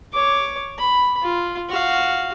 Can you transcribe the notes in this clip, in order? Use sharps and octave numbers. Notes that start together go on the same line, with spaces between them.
C#5 D6
B5
F4
F#4 F5